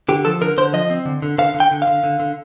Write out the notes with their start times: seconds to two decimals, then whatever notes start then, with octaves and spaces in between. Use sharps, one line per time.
0.09 D3 G4
0.25 F3 A4
0.41 D3 A#4
0.58 D3 C5
0.73 F3 D#5
0.90 C4
1.06 D3
1.22 D3
1.38 D3 F5
1.54 D3
1.60 G5
1.71 D3
1.82 F5
1.87 D3
2.04 D3
2.20 D3